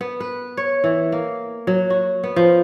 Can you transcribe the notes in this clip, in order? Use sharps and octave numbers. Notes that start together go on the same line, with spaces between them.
B3
B4
C#5
E3
A#3
F#3
F#4
B3
F3